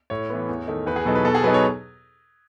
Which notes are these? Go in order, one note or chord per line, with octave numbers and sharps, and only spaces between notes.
A2 C#5
E3 B3
E2
D#3 A3 D#4
E2 B4
G#4
B2 F#3 B3 D#4 A4
B4
B2 A4
G#4
F#3 B3 D#4 B4
C#5